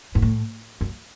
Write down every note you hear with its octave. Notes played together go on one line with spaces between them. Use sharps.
G#2
A2
F#2